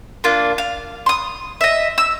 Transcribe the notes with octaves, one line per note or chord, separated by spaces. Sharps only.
A#3 D4 F4
F5
C6 D#6
D#5 E5
E6